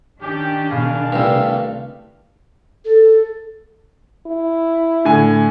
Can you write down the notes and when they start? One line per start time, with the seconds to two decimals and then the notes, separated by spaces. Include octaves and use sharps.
0.20 D#3 C#4 D4 G4
0.70 B2 B3 G#4 F5
1.12 C2 G2 A3 E4
2.85 A4
4.27 E4
5.05 A2 D3 G#5